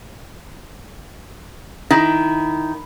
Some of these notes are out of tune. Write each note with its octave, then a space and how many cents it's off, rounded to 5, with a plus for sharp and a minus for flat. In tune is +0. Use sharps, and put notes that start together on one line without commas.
D#3 +0 E4 +0